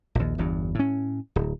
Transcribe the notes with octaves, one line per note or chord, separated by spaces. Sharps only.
A#1 D#2
G1 E2 G2
A2 C#4
D1